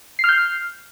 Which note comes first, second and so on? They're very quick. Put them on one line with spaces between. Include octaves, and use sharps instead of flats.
C7 F6 G6